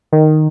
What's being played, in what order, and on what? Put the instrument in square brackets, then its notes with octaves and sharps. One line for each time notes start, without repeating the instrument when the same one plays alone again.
[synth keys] D#3